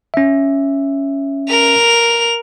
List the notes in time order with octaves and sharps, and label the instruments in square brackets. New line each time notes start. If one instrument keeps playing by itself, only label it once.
[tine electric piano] C#4 E5
[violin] A#4 F7